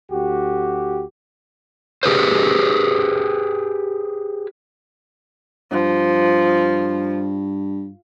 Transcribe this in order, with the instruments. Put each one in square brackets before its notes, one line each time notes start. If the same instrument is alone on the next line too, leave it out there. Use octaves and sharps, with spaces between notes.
[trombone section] D2 F#4 G4
[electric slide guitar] G4 G#4 B4 C5
[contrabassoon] G2 [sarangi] F3